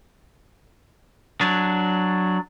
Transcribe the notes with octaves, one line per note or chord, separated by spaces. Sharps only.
F#3 D4